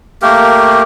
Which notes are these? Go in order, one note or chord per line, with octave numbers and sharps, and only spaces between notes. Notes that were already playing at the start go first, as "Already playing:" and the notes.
A3 A#3 G4 A#4